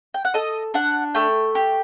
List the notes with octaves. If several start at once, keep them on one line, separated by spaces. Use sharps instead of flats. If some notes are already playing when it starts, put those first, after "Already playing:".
G5
F#5
A4 D#5
D4 F#5
A3 G5
G4